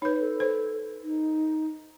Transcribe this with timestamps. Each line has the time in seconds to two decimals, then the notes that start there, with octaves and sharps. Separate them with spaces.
0.02 D#4 B4 C#5
0.20 A4
0.40 C5
1.03 D#4